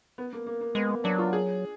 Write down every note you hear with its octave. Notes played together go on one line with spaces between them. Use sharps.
B3
A#3
A#3
A#3
G#3 B3
A#3
F#3 D4
F4
G#4